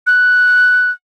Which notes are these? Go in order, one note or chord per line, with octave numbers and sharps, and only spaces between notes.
F#6